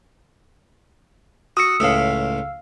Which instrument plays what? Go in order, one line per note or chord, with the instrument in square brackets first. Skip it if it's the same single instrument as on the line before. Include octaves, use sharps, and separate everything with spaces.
[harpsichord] F#4 [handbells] D#6 E6 C#7
[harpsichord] C#2 A2 [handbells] F5 E6